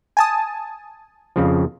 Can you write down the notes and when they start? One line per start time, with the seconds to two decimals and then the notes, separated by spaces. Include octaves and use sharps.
0.17 G#5 A5 D#6
1.36 F2 C#3 F3